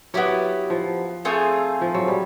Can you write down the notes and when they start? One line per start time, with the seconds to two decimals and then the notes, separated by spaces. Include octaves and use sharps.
0.14 F#3 B3 E4 G4
0.70 F3
1.25 A3 C4 F4 G#4
1.81 F3
1.94 F#3
2.08 G3